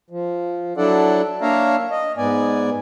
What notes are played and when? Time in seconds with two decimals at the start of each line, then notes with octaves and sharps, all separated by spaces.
0.10 F3
0.77 F#3 D4 E4 A4 D5 F#5
1.42 A#3 D4 C#5 E5 F5 A#5
1.91 D#5
2.17 G#2 B3 D5 G#5